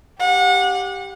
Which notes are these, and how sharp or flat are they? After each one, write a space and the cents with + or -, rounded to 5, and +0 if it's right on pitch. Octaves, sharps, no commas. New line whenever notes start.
G4 +0 F#5 -30